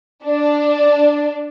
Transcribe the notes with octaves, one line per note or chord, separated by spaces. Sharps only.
D4